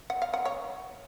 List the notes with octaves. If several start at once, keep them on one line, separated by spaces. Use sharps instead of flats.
F#5
F5
F#5
C#5